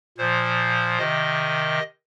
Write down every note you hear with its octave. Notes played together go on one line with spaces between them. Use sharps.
A#2 F3 C5
C3 D#3 D#5